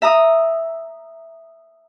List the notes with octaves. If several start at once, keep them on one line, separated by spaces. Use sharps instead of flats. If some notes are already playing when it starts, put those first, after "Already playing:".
E5 A#5 D#6